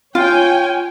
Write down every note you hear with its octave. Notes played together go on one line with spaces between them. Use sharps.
F4 C#5 G5 G#5